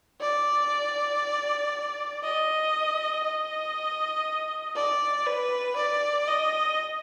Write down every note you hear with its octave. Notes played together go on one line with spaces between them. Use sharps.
D5
D#5
D#5
D5
B4
D5
D#5